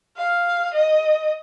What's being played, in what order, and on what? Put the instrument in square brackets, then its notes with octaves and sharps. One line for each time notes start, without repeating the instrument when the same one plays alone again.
[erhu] F5
D#5